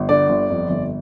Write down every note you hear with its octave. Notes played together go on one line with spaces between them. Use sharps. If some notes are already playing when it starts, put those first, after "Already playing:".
Already playing: G1
D3 D5
G1
F2
G1